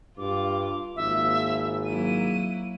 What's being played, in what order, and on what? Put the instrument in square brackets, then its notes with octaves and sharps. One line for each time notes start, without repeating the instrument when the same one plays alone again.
[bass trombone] G2 [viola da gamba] F4 [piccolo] D6
[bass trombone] G#1 [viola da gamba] F3 A#3 [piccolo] E5
[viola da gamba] F#3 A#3 E4 [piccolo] D#7